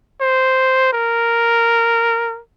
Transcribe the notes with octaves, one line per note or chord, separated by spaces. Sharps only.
C5
A#4